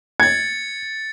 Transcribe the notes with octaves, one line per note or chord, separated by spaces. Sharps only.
G#6 A6 C#7